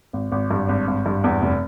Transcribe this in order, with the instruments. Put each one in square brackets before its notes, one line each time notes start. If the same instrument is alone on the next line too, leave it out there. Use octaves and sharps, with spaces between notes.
[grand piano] G#1
G#1
G2
G#1
G#1
G2
E2
F1